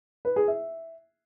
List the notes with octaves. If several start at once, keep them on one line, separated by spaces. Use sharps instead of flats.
B4
G#4
E5